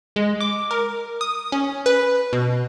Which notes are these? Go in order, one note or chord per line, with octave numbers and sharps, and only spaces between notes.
G#3
D6
A#4
D#6
C#4
B4
B2